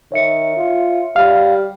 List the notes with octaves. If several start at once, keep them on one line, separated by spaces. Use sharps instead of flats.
D#3 C#5 E5 C#7
F4
G3 F5